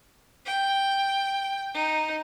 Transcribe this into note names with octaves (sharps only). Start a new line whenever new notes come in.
G5
D#4